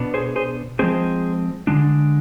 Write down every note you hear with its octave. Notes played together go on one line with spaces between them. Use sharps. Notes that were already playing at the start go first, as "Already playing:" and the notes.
Already playing: B2 B3 D4
G#4 C5
G#4 C5
F3 G#3 C4 G#4 C5
D3 G#3 D4